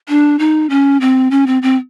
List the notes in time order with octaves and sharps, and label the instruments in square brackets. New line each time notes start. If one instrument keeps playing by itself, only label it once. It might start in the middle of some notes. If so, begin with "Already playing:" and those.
[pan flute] D4
D#4
C#4
C4
C#4
C4
C4